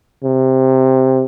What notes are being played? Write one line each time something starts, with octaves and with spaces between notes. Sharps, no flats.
C3